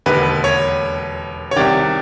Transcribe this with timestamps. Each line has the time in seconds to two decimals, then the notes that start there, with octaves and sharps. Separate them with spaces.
0.06 E1 D#2 D3 B4
0.44 C#5
1.51 C#5
1.56 C2 C3 D#3 D5